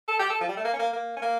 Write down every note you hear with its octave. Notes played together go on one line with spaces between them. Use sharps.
A4
G4
A4
F3
G3
A3
A#3
C#4
A#3
A#3
C#4
A#3